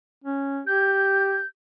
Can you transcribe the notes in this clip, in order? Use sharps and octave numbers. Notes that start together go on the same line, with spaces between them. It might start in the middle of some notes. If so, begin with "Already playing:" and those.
C#4
G4 G6